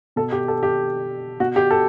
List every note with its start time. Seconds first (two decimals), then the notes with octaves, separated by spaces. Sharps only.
0.16 B2 A4
0.32 G4
0.48 A4
0.63 G4
1.40 B2 F#4
1.56 G4
1.71 A4